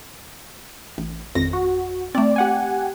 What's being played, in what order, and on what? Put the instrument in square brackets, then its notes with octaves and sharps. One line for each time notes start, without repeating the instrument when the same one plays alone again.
[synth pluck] A1
[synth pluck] G#1 F2 [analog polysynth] A#6
[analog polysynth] F#4
[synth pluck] A3 C4 [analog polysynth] D5
[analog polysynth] G4 F#5 G#5